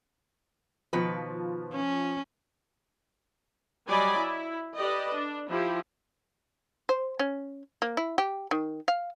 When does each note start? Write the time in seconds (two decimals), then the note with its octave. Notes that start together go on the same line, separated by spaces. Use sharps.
0.93 B2 D#3 F3 B4
1.74 C#4
3.88 F#3 G3 D5 D#5 G#5 B5
4.18 E4
4.76 G4 A4 B4 D5 D#5
5.15 D4
5.49 F3 E4 G4
6.89 C5
7.19 C#4
7.82 A#3
7.97 E4
8.18 G4
8.51 D#3
8.88 F5